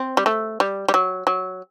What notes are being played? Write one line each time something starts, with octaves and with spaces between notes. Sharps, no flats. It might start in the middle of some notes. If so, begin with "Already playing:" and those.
Already playing: C4
G3
A3
G3
G3
F#3
F#3